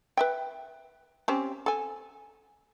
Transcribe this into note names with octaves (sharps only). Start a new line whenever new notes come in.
B4 E5 G5
C4 C#4 G4
A4 G#5